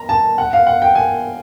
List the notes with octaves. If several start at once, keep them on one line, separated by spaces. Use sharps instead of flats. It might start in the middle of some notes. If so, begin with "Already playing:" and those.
Already playing: A#5
A5
F#5
F5
F#5
G5
G#5